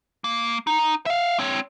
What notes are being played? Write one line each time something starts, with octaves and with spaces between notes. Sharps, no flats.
A#3
D#4
E5 F5
C4 C#5